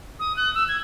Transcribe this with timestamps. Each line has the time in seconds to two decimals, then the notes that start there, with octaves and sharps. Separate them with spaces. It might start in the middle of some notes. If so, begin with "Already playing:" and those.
0.20 D#6
0.37 F#6
0.55 E6
0.68 G#6